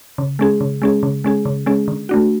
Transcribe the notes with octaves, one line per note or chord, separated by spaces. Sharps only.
C#3
G#3 C#4 G#4
C#3
G#3 C#4 G#4
C#3
G#3 C#4 G#4
C#3
G#3 C#4 G#4
D3
A3 D4 F#4